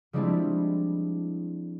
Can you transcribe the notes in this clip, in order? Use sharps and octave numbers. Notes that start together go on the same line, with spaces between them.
F3 G3 G#3 C4 D4 E4